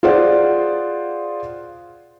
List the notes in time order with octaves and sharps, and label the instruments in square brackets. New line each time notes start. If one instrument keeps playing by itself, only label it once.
[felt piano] F4 G#4 C5 D5 F#5